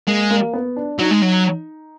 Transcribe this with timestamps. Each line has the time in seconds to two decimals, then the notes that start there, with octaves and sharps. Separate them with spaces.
0.07 G#3 A#3
0.31 A#3
0.53 B3
0.76 D4
0.99 F#3 D#4
1.11 G#3
1.22 F#3